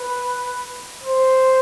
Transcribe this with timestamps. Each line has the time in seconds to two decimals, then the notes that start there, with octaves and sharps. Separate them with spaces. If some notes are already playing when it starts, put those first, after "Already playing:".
Already playing: B4
1.04 C5